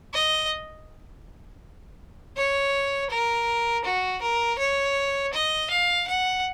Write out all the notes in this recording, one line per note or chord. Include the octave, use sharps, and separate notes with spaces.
D#5
C#5
A#4
F#4
A#4
C#5
D#5
F5
F#5